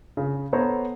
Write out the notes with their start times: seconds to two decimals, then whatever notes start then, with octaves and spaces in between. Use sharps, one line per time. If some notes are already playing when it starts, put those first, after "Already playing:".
0.17 C#3
0.53 B3 A4 C5 C#5 A#5